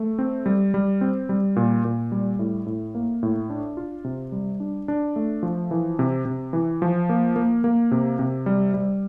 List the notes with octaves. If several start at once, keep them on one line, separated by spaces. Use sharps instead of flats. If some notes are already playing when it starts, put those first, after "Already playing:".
Already playing: A3
C4
G3
G3
C4
G3
A#2
A#2
G3
A2
A2
A#3
A2
D4
F4
C3
G3
D4
D4
A3
F3
E3
C3
C3
E3
F3
A#3
A#3
A#3
C3
C3
G3
G3